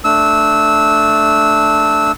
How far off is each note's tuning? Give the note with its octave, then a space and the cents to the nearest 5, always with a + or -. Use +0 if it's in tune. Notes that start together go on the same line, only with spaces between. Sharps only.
A3 +0 D4 +0 E6 -20